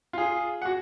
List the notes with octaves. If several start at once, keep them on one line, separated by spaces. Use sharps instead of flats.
F4 G#4
F#4 F#5